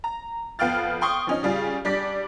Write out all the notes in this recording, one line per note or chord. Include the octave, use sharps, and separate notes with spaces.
A#5
F2 B3 F5 G5 F6 A6
G5 C6 C#6 D#6
F3 C#4 D#4
C#3 G3 F4 G#4
G3 D4 D5 B6